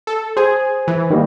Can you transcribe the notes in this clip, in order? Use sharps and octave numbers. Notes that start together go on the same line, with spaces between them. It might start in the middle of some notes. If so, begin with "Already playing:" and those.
A4
G#4 C5 G#5
E3
D#3 G3 A#3